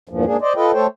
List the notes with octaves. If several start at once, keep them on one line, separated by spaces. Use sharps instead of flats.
E2 G2 A#2 F3
G#2 A#3 D4 G#4
C5 D5 D#5
F4 A4 B4 D#5 G5
A3 A4 C5 C#5 G5